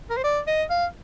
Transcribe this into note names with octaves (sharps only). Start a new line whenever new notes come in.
A#4
C5
D5
D#5
F5